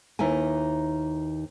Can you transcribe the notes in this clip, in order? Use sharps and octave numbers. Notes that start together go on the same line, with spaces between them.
D#2 D#4 E4 B4 G#5